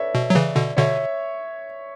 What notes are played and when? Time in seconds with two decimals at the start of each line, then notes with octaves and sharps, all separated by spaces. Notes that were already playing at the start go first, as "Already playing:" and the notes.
Already playing: A4 B4 C#5 D5 E5
0.15 B2
0.30 F#3
0.35 C#3 E3
0.56 B2 D3
0.77 B2 D3 C#5 E5